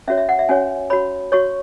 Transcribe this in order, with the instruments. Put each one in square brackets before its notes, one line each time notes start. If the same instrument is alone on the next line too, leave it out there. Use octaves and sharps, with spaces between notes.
[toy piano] C#4 F#4 C#5 E5
E5
F#5
E5
C#4 F#4 C#5 G#5
F#4 C#5 B5
F#4 C#5 C#6